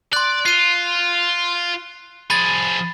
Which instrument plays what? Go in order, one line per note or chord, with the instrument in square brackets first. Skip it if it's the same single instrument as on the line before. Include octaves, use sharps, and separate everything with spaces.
[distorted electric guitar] D5 [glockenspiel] C6 F#6
[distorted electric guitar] F4 [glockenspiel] C7 D#7
[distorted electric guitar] F3 G#4 [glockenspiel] B5 A6